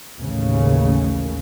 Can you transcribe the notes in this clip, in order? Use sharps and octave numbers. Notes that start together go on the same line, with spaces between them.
A1 D#2 C#3